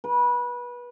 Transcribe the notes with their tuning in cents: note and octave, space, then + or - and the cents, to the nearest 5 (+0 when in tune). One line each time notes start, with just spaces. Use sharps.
B4 -25